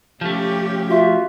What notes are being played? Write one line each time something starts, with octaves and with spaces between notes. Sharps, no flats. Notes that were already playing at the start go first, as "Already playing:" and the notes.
F3 A3 C#4 G4
F4 F#4 E5